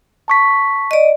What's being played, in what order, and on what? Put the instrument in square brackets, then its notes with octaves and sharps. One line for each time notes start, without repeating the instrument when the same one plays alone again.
[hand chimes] A5 C#6 B6
[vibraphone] D5 D#5